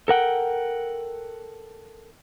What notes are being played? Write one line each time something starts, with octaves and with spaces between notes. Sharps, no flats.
A4 A#4 F#5 G5